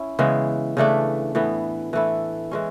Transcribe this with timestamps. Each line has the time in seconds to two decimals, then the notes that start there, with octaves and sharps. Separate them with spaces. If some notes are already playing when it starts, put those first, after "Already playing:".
Already playing: C#4 E4
0.19 C#3 E3 G#3 B3
0.77 C#3 E3 A3 D4
1.35 A2 E3 B3
1.93 E3 A3 E4
2.51 E3 G#3 C#4